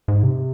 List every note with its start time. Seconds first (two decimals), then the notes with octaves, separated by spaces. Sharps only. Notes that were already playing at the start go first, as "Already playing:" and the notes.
0.08 G#2
0.23 C3